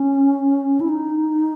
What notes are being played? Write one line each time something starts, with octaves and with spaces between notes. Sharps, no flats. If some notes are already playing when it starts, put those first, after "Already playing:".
Already playing: C#4
E4
D#4